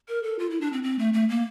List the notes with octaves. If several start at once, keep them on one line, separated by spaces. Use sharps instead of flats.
A#4
A4
F4
E4
D4
C4
C4
A3
A3
A#3